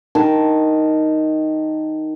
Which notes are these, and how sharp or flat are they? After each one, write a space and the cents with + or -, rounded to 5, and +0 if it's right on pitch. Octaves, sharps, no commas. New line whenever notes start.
D#3 +0 A5 +0